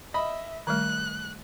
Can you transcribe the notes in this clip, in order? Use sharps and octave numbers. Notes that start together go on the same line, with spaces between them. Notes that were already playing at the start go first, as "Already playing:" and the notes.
D#5 E5 B5
D#3 G3 A3 F#6